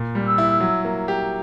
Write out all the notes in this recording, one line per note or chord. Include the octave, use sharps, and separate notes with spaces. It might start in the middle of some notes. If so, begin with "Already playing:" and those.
Already playing: A#2
G3
E6
E4
F#3
A#3
G4